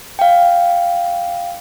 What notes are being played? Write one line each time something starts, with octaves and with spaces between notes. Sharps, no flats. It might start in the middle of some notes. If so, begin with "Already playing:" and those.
F5 G5